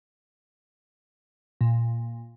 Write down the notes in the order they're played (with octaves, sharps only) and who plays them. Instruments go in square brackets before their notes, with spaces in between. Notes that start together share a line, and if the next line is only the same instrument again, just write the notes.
[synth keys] A#2